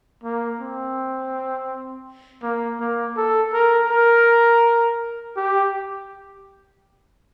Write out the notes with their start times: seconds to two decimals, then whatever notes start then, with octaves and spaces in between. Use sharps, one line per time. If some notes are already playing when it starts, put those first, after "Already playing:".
0.23 A#3
0.60 C4
2.42 A#3
2.80 A#3
3.16 A4
3.53 A#4
3.90 A#4
5.36 G4